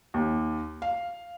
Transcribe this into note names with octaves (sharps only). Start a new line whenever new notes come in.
D#2
F5